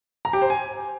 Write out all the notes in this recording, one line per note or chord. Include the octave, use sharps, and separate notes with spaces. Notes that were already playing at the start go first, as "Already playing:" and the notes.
A#5
G4
C5
G#5